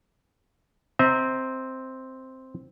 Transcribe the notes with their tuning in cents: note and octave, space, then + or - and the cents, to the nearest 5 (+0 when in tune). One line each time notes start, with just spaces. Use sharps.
C4 +0 E5 -45 A#5 -5